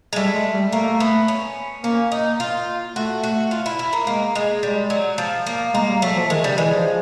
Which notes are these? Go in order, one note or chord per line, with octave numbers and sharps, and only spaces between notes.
G#3
G3 A3
G#3
G3
A3 A#3
B3
C#4
A#3 C#4
D#4
F4
A3 F#4
F#4
F4
E4
E4
A#3
G#3 A#3
G#3
G3 G#3
F#3
F3
A#3
G#3 A#3
G3
F#3 A3
F3
D#3 G#3
C#3 G3
E3 G#3
F3